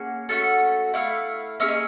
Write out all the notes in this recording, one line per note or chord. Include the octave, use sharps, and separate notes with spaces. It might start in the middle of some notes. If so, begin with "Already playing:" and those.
Already playing: A#3 C#4 G#4 F#5
A3 C#4 F#4 A4
A3 C#4 E4 F5
A#3 C#4 G#4 E5
D#5